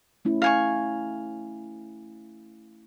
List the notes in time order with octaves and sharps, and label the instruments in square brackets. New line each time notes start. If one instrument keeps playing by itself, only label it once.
[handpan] A3 C#4 E4
[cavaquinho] F5 G#5 C#6